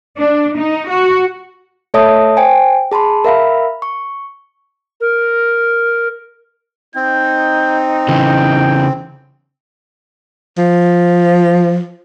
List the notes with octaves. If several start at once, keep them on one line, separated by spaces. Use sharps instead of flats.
D4
D#4
F#4
A3 A4 C#5 E5 A5 D#6
C5 G5 G#5
G#4 A5 B5 C6
A#4 E5 F5 B5
C#6
A#4
C4 D#4 G6
C#3 E3 G5
F3